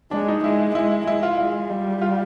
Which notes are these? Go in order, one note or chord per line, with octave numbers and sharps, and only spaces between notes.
G#3 D4
D#4
G#3 E4
G#3 E4
G#3 E4
F4
G#3
G3
F4